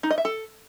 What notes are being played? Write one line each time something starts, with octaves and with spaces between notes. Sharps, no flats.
D#4
D#5
E5
A4